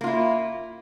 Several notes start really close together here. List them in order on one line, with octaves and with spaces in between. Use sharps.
A#3 F4 E4